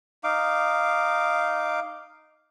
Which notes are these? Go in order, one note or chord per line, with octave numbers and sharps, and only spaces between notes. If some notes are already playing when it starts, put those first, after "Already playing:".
D#4 F5 D6